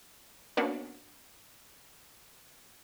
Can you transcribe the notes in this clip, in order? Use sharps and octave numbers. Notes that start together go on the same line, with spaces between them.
A#3 B3 C#4 D4 F#4